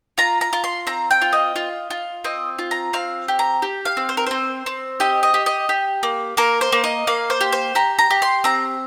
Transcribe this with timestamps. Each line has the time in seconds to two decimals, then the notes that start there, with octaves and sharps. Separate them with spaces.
0.18 F4 A#5
0.41 A#5
0.53 F4
0.64 C6
0.87 C4 A#5
1.11 G5
1.21 F4
1.33 D#5
1.56 F4
1.90 F4
2.24 C4 D#5
2.59 F4
2.71 A#5
2.93 C4 F5
3.28 G4
3.39 A#5
3.62 G4
3.85 F5
3.97 C4
4.09 C5
4.17 A#4
4.26 C4 C5
4.66 C4
5.00 G4 D#5
5.23 D#5
5.34 G4
5.46 D#5
5.69 G4
6.03 A#3
6.37 A#3 A#4
6.61 C5
6.72 A#3
6.84 D#5
7.07 A#3 F5
7.30 C5
7.41 G4
7.52 C5
7.75 G4 A#5
7.99 A#5
8.11 G4
8.22 C6
8.44 C4 A#5